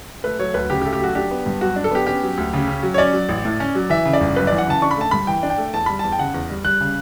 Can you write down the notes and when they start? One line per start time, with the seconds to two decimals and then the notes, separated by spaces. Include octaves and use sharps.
0.24 A3 B4
0.39 F#3 C#5
0.54 D2 B4
0.70 C#3 G4
0.82 G4
0.85 A3
0.93 G4
1.00 F#3 F#4
1.15 D4 G4
1.31 B3
1.46 G2
1.61 F#3 F#4
1.76 D4
1.84 A4
1.91 B3 G4
2.07 C#4 G4
2.23 F#3
2.38 D2
2.53 C#3
2.68 C#4
2.83 F#3
2.94 C#5
2.98 C#4 D5
3.13 F#3
3.29 A1
3.45 A2
3.60 C#4
3.75 F#3
3.90 E3 E5
4.05 C#3
4.13 D5
4.21 G1
4.36 F#2 B4
4.47 E3 D5
4.58 F#5
4.67 C#3 A5
4.82 D4 C#6
4.91 B5
4.97 A3 A5
5.11 G2 B5
5.27 E3 G5
5.43 D4
5.50 G5
5.58 A3
5.74 E2 A5
5.86 G3 B5
5.99 E2 A5
6.12 G5
6.19 C#3 F#5
6.34 E2
6.50 G3
6.64 G3 F#6
6.80 C#3